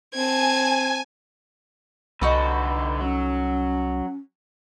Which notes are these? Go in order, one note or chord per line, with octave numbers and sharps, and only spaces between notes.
C4 G#5 A5 G#6
C2 D3 D#4 F#4 A4 B4
F#3 C#4